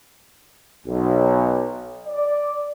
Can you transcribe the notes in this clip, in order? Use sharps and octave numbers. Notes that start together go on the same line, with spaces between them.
B1
D5